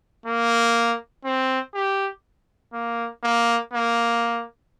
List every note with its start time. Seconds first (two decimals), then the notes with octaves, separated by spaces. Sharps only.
0.26 A#3
1.25 C4
1.74 G4
2.74 A#3
3.24 A#3
3.73 A#3